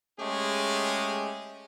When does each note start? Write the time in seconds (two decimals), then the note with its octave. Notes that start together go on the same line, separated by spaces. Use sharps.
0.19 G#3 A3 C#4 G4 G#4